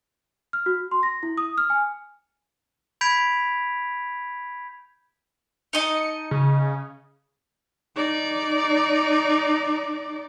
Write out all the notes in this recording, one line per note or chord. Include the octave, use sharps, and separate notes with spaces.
F6
F#4
C6
A#6
E4
D#6
F6
G#5
B5 G6 G#6 B6 D7 F7
D#4 D#5 A5 C#7
C#3
D#4 D5